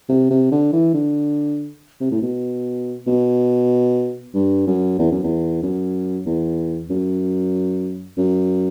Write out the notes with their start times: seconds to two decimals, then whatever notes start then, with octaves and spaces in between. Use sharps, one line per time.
0.09 C3
0.31 C3
0.52 D3
0.73 E3
0.94 D3
2.01 C3
2.11 A2
2.22 B2
3.07 B2
4.34 G2
4.67 F#2
4.99 E2
5.11 F#2
5.23 E2
5.63 F#2
6.26 E2
6.90 F#2
8.18 F#2